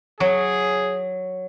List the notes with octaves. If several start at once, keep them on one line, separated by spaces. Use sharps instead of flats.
F#3 G#4